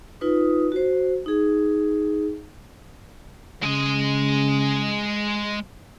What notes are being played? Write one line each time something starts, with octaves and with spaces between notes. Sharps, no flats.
D#4 F4 B4 D#6
F#4 C5
D#4 G#4
C#3 G#3 D#5